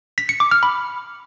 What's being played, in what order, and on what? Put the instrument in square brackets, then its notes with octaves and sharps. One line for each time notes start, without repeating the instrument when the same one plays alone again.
[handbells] B6
C#7
D6
F6
B5